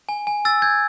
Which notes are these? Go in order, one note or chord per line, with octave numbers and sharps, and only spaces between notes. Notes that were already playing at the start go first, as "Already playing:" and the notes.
G#5
G#5
E6 A6
G6 G#6